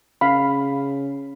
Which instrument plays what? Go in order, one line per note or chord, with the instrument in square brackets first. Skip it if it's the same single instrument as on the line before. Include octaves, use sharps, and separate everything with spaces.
[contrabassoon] C#3 [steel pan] F5 B5